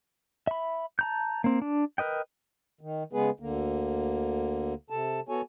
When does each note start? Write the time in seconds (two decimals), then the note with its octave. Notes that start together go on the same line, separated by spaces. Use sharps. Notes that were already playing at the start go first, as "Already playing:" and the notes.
0.47 E5 B5
0.99 A5 A#5 G6
1.44 A#3 C4
1.62 D4
1.98 A#4 B4 D#5 G5
2.81 D#3
3.13 C#3 G#3 B3 G#4 B4
3.40 D2 D3 A#3
4.90 C3 A4 A5
5.29 B3 F#4 A4 C#5 G#5